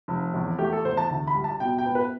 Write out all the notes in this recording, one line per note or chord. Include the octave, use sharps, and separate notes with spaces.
F1
E2
A3 G4
A4
E2 C5
A5
D2 A5
B5
G3
A5
B2 G5
G5
B3
B4